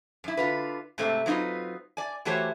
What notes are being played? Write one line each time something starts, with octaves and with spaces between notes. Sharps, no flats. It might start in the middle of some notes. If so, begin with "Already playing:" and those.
F#2 E4
D3 F4 B4
G#2 C3 A3 C4
F#3 C4 D#4 F4 B4
D5 G#5
E3 A3 F#4 G4 C5 C#5